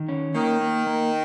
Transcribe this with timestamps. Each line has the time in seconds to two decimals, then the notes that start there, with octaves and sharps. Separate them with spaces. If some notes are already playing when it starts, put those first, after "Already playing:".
Already playing: D#3
0.09 C#4
0.35 D#3 A#3
0.61 A#3
0.87 A#3